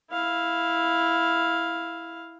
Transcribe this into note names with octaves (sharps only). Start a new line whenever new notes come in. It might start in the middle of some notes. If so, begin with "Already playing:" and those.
E4 F5